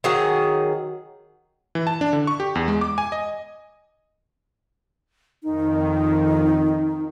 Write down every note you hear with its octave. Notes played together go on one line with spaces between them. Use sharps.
D#3 F#3 G#4 F#5
E3
A5
D4
D3
C#6
G4
E2
G#3
D6
G#5
D#5
F2 D#3 D#4